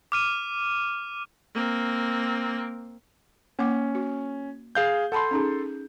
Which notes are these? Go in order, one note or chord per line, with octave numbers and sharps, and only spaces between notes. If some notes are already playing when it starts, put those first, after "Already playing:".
D6 F6 D#7
A#3 C4
A#3 C#4 F#5 D6
F#4
G#4 F5 G6
A4 F#5 A5 B5 C6
C#4 D#4 G#4